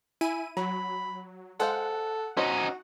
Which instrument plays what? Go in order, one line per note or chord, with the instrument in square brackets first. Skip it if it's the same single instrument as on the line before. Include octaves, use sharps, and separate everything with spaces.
[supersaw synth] E4 D#7 [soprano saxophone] G#5
[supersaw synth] F#3 [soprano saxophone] B5
[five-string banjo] G#3 C5 F5 [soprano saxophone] A4 [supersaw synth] F#5
[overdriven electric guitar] C#4 D#4 [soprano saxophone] F#4 [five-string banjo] C5 C#5 D#5